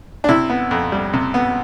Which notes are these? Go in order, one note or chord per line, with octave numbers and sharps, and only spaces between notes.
D4
C3 E4
B3
F2
G3
C3
B3